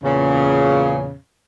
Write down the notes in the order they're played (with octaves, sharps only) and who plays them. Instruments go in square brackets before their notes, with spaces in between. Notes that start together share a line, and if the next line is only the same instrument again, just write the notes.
[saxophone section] E2 A#2 C#3